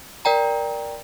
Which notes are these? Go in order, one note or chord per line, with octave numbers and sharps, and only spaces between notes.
A#4 D5 G5 A#5